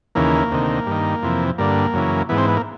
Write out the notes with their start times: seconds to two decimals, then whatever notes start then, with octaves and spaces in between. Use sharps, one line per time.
0.15 D#2 C#3 E3 A#3
0.51 D2 C3 D#3
0.86 G2 D#3
1.23 F2 C3 E3
1.58 G2 D3 A#3
1.94 F#2 C#3 E3
2.29 G#2 E3 B3
2.38 C4
2.48 B3
2.57 A#3